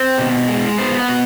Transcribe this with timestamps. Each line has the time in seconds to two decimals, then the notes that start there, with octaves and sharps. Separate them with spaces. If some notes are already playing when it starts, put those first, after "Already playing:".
Already playing: C4 C5
0.18 B2
0.48 G#3
0.78 B3 C5
0.99 B4
1.09 B2